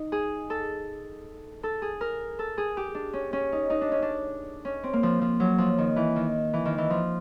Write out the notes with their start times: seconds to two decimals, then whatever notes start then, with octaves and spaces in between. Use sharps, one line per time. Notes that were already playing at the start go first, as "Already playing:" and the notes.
Already playing: D#4
0.12 G#4
0.50 A4
1.63 A4
1.82 G#4
2.01 A#4
2.39 A4
2.58 G#4
2.77 G4
2.95 D4
3.13 C#4
3.33 C#4
3.52 D#4
3.70 D#4
3.81 D4
3.92 C#4
4.02 D4
4.65 C#4
4.84 C4
4.93 A#3
5.03 F3
5.21 F3
5.40 F#3
5.58 F3
5.78 D#3
5.96 E3
6.16 D#3
6.53 E3
6.65 D#3
6.78 E3
6.90 F3